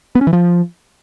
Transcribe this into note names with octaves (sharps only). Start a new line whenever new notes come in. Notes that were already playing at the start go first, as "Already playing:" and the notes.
B3
C#4
E3
F3